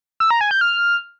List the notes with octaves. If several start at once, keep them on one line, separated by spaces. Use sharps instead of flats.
E6
A#5
G#5
G6
F6